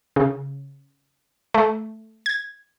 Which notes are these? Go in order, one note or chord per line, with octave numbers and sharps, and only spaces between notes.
C#3
A3
G#6